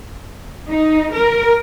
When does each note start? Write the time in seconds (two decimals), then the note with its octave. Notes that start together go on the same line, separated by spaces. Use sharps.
0.68 D#4
1.12 A#4